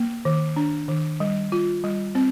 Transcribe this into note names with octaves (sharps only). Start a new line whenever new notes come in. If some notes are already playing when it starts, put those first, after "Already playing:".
Already playing: A#3
D#3
D4
D#3
G3
F4
G3
C4